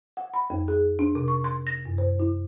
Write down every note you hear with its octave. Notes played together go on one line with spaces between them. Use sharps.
F#5
B5
F2
G#4
D4
C3
C#6
C6
A#6
F#2
C5
E4